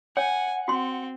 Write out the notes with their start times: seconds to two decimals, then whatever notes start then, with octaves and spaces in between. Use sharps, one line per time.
0.17 C#5 F#5 G#5
0.68 C4 F#4 C6